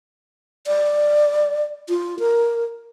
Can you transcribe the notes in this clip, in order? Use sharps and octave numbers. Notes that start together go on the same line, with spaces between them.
D5
F4
A#4